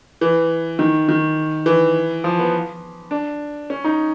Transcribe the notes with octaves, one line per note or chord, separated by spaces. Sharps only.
E3
D#3
D#3
E3
F3
B3
D4
C#4
D#4